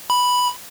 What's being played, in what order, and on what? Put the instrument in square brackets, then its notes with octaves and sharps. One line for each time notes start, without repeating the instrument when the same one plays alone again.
[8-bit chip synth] B5